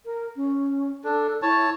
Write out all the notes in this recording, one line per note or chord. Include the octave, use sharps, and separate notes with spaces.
A#4
C#4
D4 A4
E4 C#5 A5